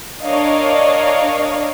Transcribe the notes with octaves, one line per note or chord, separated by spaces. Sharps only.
D4 A#4 C#5 D#5 F5